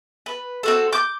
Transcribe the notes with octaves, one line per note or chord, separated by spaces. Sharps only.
B4
C4 F#4 A4
D6 G6